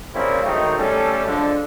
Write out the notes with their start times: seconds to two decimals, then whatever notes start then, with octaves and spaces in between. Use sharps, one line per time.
0.15 C#3 G3 A#3 C4 E4 F4
0.44 D#3 F#3 G#3 A3 C4 D#4
0.78 G3 A3 C#4 A4
1.27 D3 F3 G#3 D4